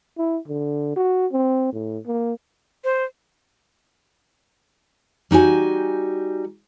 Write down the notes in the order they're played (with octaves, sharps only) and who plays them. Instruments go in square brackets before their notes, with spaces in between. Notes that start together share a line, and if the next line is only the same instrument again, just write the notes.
[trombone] E4
D3
F#4
C4
A2
A#3
[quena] C5
[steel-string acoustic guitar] G3 D#4 F#4 G#5